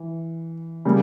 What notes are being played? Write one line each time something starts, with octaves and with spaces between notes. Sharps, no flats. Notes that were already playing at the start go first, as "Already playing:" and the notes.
Already playing: E3
C#3 G3 A#3